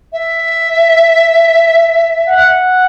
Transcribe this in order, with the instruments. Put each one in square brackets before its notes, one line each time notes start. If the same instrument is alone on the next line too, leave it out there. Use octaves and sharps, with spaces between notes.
[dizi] E5
[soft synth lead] F#5